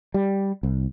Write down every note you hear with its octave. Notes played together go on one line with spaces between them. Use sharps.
G3
C2